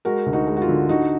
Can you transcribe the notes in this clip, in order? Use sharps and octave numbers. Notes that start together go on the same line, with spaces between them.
G#3 F#4 A#4
D2
D#4 F#4
G#3
F#4
F4
D3
D3 D#4 F#4